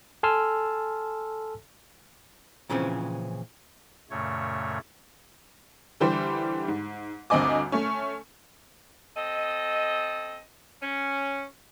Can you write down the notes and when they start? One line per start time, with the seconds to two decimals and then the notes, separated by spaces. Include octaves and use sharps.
0.23 A4 G#5 A5 C6 E6 F6
2.69 A#2 C#3 E3 F3 C4 C#4
4.11 F#2 A#2 C#3 A3 C#5
6.00 D3 E3 G3 G4 C5
6.68 G#2
7.30 G1 D2 C4 D#5 G#5 D6
7.72 A3 C#4
9.17 C4 A4 D#5
10.83 C#4